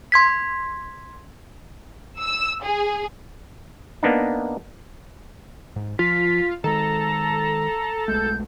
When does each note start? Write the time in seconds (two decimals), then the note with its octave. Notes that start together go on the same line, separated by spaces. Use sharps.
0.12 C6 G#6 B6
2.20 E6
2.63 G#4
4.03 A#3 B3 D4 D#4
5.76 G#2
5.99 F3 F4 B6
6.64 D#3 G#3 A4 A#5
8.08 B1 G#3 A3 G6